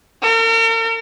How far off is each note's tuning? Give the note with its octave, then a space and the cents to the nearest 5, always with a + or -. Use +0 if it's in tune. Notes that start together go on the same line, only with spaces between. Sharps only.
A#4 -45